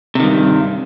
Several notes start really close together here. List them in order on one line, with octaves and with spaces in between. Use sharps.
C3 D#3 G2